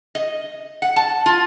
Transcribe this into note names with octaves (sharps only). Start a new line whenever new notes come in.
D#5
F#5
A5
F4